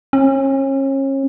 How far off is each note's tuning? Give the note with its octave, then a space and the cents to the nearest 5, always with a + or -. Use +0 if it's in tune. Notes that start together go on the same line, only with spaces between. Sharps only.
C#4 -35